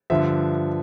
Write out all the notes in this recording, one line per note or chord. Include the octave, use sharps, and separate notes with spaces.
G2 D3 F3 E5